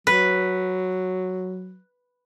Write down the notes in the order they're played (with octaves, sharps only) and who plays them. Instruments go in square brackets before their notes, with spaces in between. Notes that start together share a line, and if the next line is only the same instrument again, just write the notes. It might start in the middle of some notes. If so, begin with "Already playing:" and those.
[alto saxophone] F#3 [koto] B4